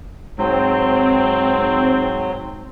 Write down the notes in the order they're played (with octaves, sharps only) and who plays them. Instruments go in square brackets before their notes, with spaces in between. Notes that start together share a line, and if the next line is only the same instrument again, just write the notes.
[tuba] G#2 [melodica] F#3 [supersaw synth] C4